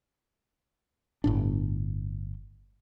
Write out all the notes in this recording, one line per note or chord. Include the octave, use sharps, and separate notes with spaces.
G1 A2 D4